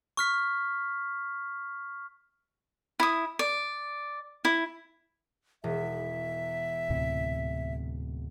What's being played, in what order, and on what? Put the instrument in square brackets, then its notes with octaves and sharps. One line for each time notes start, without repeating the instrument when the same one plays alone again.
[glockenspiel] C#6 F6 B6
[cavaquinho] E4 D#6
D5
E4
[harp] E1 [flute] E5
[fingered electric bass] D2 A2 C3